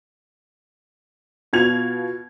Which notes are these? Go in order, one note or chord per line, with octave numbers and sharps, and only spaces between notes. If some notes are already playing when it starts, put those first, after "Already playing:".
B2 F4 G#6 F7